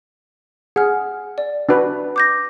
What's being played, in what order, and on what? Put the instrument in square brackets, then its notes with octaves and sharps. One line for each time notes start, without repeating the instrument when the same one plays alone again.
[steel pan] G#4 [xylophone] F#5 F6
[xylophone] D5
[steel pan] D4 F#4 B4
[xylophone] D6 G6 A#6